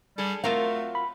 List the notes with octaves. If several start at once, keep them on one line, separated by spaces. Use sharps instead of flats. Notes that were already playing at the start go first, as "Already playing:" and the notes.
G3 G#4 A4
F#3 A3 C4 F4 A#4 F5
B5